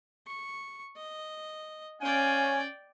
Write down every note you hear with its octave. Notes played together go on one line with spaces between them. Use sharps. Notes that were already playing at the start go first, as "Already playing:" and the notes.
C#6
D#5
C#4 D5 F5 G5 G#5